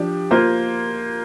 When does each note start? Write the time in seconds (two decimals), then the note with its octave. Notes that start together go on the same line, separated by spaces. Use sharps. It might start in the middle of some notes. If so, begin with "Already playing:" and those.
Already playing: F3 D4 G4
0.31 A#3 F4 C5